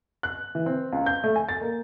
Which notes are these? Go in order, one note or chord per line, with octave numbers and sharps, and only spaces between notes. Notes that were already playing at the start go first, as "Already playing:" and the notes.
F#6
E3
C4
C#2
G6
A3
G#5
A6
A#3